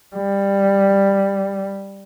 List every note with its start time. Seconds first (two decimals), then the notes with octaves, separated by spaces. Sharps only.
0.16 G3